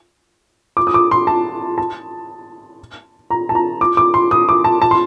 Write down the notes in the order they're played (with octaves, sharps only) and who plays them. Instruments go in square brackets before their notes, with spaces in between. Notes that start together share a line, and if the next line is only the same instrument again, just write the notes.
[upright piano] D6
D#6
D6
C6
A5
A5
A#5
A5
A#5
D6
D6
C6
D#6
D6
A5
A5
C6